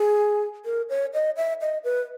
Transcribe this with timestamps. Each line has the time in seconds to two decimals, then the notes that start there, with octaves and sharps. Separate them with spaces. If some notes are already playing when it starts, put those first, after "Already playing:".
Already playing: G#4
0.65 A#4
0.89 C#5
1.14 D#5
1.37 E5
1.61 D#5
1.84 B4